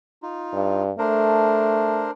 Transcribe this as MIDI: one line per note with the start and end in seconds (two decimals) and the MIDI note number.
0.22 0.83 63
0.22 0.83 65
0.54 0.91 43
0.98 2.08 57
0.98 2.11 62
0.98 2.11 70
0.98 2.11 72